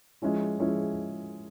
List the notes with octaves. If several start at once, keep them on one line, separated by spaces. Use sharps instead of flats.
F3 G#3 C#4 E4
F3 G#3 C#4 E4